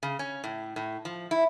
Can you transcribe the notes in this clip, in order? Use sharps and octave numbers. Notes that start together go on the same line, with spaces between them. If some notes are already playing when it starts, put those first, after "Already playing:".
C#3
C#4
A2
A2
F3
E4